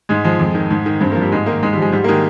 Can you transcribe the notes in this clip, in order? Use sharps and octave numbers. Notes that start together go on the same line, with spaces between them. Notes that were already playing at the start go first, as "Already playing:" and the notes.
G#2 G#3
F3 G#3
F2
D#3
G#2
D#3
G2 C4
A#3
F3
G3
G#2 G#3
D#3 A#3
G#2 G#3
F3 G3
G#3
G#2 G3
A#3
D#3 G#3